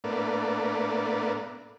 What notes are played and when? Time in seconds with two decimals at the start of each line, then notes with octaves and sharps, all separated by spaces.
0.04 A2 A#3 B3 D4